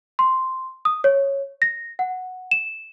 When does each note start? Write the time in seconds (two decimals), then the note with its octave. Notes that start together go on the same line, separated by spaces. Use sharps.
0.19 C6
0.85 D#6
1.04 C#5
1.62 A#6
1.99 F#5
2.51 E7